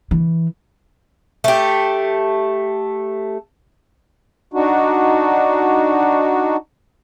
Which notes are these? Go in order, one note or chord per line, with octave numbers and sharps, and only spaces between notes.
E3
A3 G4
D4 D#4 F#4